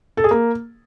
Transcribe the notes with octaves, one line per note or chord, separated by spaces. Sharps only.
A4
G#4
A#3